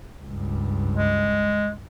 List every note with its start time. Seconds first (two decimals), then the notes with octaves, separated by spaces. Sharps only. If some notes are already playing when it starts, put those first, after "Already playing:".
0.23 C#2 G2
0.95 G#3